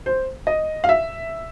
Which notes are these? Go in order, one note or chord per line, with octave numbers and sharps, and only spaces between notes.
C5
D#5
F5
E5